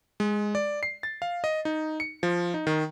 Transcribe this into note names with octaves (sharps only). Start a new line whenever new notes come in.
G#3
D5
C7
A6
F5
D#5
D#4
C#7
F3
D#4
D#3